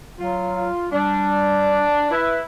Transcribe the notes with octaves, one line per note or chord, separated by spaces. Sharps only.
F#3 F4
G3 D4
E4 B4